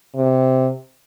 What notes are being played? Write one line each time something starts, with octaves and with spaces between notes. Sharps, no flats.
C3